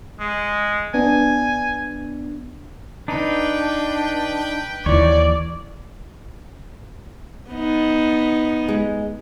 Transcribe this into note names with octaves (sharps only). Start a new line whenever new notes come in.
G#3
B3 D4 G#5
D4 D#4 B4 G5
D#2 E3 C#5 D5
B3 D#4
G#3